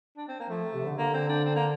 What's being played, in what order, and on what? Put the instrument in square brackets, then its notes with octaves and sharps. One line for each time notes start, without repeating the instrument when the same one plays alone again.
[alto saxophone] D4
C4
A#3
[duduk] F3 [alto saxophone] A3
[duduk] C3
D3
[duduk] D3 [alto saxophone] A#3
[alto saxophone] C4
D4
C4
A#3